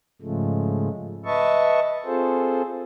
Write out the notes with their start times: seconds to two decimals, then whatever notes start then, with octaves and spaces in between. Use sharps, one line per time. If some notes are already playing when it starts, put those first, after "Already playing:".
0.22 G#2 C#3 F3 G#3 A3
1.25 B4 D#5 E5 A5 C#6
2.05 C4 F4 G#4 A4 C5